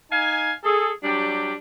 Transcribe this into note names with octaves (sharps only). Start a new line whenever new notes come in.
D#4 F5 G#5
G#4 A4
F#3 G3 D4 G4